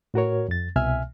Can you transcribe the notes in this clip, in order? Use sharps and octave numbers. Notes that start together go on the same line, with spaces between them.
A2 F#4 A#4 C#5
F2 A6
C2 B2 E5 G#5 F6